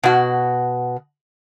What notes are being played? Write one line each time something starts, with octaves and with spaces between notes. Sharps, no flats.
B2 F#4